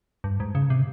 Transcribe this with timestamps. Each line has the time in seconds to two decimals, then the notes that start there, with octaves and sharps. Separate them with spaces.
0.24 G2
0.40 G#2
0.55 C#3
0.70 C3